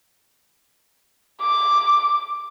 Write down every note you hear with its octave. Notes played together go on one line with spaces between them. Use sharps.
D6